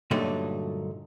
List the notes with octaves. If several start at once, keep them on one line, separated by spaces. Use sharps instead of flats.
G2 A#2 D3 F#3 A3 D#4